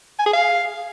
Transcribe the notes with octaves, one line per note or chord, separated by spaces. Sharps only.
G#5
G#4
F5